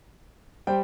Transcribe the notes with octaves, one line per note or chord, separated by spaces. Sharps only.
G3 C5 G5